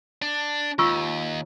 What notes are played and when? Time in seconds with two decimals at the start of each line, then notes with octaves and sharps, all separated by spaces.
0.22 D4
0.79 D#2 F4 C#6 E6